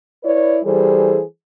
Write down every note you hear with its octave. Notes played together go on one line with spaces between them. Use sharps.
E4 B4 C#5 D5
E3 G3 G#4 A4 C5